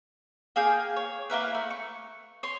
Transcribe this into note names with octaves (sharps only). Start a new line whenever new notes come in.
A#3 G#4 F5 G5
C#5
A#3 E4 A#4 B4
A3
C#6
C#5 C6